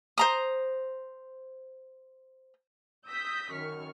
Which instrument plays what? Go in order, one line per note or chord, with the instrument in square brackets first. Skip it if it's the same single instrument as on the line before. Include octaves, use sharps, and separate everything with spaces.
[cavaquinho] C5 A#5 D#6
[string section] D#6 E6 G6 A#6 B6
F#2 D#3 C#6 F6